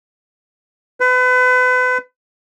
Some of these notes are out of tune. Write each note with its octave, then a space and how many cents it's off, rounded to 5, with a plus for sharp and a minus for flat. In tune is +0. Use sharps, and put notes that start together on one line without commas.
B4 +35